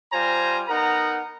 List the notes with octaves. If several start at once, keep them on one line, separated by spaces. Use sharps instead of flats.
G3 F4 C5 G#5 A#5
B3 D#4 A#4 F#5 A#5